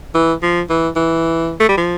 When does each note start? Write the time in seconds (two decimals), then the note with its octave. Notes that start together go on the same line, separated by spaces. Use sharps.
0.14 E3
0.42 F3
0.70 E3
0.96 E3
1.60 A3
1.69 G3
1.77 F3